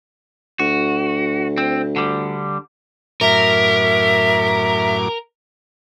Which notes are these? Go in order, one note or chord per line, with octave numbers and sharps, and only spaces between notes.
D2 F#4
C4
D3 G3
F#2 A2 A#4 E5 D6